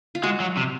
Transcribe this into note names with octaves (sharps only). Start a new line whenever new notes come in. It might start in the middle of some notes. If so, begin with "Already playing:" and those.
F4
G#3 F#4
F#3
C3